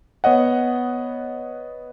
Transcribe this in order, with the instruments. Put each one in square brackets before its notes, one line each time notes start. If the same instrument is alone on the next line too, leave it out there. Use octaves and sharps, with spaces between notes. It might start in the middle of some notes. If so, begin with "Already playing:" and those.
[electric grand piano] B3 C#5 D#5 F#5